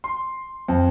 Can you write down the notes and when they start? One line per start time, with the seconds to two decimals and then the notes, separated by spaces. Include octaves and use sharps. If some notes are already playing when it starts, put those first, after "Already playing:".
0.04 C6
0.68 F2